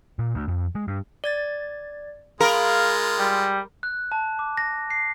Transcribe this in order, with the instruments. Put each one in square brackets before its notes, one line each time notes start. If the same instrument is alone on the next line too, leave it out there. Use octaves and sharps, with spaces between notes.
[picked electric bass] A#2
D2
F2
G#3
G2
[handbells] D5 G#6 A6
[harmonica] G#3 F4 [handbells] G#4 B5 [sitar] A#4 [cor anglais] F5
[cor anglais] G3
[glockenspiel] F#6
A5
D6
A#6
C7